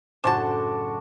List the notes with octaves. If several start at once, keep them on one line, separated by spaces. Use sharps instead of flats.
F#1 A2 D4 F#4 C5 G#5 A5 C6